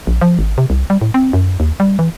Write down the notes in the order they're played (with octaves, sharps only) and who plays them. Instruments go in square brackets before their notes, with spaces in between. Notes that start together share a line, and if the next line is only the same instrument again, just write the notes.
[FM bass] A#1
F3
G#1
C3
C2
G3
A2
C4
F#2
D#2
G3
E3